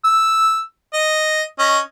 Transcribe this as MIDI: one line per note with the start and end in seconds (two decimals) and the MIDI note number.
0.05 0.61 88
0.94 1.43 75
1.59 1.78 61
1.59 1.78 75